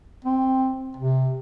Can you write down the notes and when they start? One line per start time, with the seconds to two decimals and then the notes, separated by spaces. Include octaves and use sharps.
0.25 C4
0.97 C3